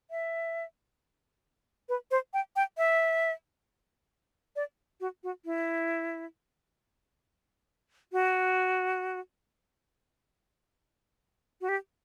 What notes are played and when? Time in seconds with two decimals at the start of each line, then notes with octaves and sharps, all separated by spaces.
0.11 E5
1.89 B4
2.11 C5
2.34 G5
2.56 G5
2.78 E5
4.56 D5
5.01 F#4
5.24 F#4
5.45 E4
8.13 F#4
11.61 F#4
11.69 G4